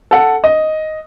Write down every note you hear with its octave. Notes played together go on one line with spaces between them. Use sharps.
A4 F#5
D#5